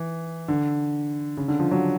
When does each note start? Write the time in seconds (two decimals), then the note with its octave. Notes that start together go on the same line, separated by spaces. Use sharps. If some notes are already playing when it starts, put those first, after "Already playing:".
Already playing: E3
0.48 D3
1.37 C#3
1.48 D3
1.59 F3
1.71 F#3